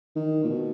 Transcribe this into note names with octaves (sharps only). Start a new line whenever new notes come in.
D#3
A#2
B2